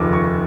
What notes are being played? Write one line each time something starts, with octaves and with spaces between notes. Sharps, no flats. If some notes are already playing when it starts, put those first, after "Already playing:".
Already playing: F1 D#2 C#3 F3 D6
C#6